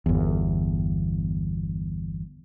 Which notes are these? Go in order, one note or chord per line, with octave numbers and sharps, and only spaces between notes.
G1 E2